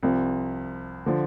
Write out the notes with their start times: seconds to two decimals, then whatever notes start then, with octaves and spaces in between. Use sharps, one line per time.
0.03 C2 C3 F3
1.06 D3 F3